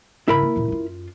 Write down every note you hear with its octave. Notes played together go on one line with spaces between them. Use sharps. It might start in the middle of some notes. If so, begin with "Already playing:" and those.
G#2 C#3 E4 A#4 B5
A#3
F#2 A#2
F#2 F4